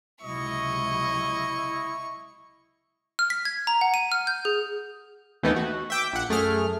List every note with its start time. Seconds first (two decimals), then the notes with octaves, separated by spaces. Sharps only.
0.22 C#2 C3 F#3 E4 D#5 C#6
3.19 F6
3.30 B6
3.45 G#6
3.67 A#5
3.81 F#5
3.94 D#7
4.12 F6
4.27 G6
4.45 G#4
5.43 D#2 E3 A3 B3 D#4
5.56 F#4
5.90 E5 G5 D6
6.13 A#1 F#5
6.29 F#2 A3 G#4 F6